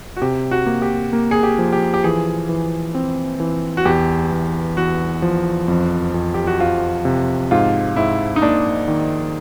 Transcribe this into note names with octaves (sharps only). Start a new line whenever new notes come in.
F#4
C3 G4
F#4
A#3
G4
A#3
G#4
G4
F3
G4
G4
E3 G#4
E3
C4
E3
F#4
E2 G4
E2
E2 F#4
F3
F2
F2
G4
F#4
F3 F4
C3
G#2 F4
G#2 E4
D#4
A#3 D4
D#3